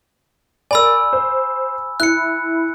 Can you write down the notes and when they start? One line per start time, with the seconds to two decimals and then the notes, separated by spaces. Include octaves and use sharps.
0.71 A#4 D5 G#5 B5 E6
1.13 C5
2.00 E4 F#6 C#7